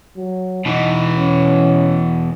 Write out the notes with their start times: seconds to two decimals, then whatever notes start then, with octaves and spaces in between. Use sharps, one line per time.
0.16 F#3
0.65 B2 E3 D#4
1.16 C#4